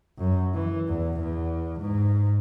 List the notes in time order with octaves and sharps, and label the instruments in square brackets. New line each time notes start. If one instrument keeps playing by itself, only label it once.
[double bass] F#2
E3
E2
E2
G#2